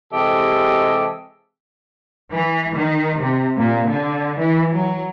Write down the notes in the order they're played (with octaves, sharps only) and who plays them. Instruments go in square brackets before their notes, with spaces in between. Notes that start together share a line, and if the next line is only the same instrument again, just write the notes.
[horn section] C3 E3 G#3 G4 A4 D#5
[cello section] E3
D#3
C3
A#2
D3
E3
F#3